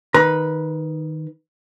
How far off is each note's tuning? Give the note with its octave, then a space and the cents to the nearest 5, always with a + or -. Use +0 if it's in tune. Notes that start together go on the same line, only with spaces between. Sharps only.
D#3 +0 B4 +0 A#5 +25